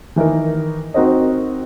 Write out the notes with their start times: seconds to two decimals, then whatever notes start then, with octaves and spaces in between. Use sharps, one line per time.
0.16 D#3 E3 D#4 A#4
0.94 C4 D#4 F#4 A#4 C5 D#5